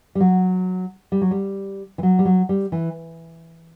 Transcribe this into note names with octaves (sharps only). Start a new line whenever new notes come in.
G3
F#3
G3
F#3
G3
E3
F#3
G3
F#3
G3
E3